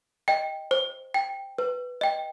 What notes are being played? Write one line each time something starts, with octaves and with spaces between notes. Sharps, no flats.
D#5 G5
C5
G5
B4
D#5 G5